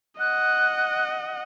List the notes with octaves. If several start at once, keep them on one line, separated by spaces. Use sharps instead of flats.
D#5 F#5 F#6